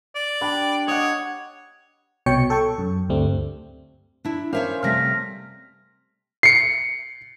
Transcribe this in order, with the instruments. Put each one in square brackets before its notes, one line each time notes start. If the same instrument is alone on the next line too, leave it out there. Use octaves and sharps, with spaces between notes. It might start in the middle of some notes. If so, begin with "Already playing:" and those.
[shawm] D5
[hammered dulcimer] D4 G4 B5
[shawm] C#5 [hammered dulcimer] D#5 F#5
[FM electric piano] C2 B2 C#5 G5 C#7
A4 G5 C#6
F#2
D2 G2 G3 A3 C4
[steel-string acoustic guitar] D4 E4
[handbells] C#4 A#4 C5 [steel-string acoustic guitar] C#5 E5 F5
[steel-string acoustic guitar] C3 G3 A3 [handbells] F6 A#6 B6
[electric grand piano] C7 C#7